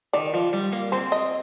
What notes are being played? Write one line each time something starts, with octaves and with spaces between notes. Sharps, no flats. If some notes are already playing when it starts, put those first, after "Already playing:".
D#3 D5
F3
G3
A#3
C4 C5
D#5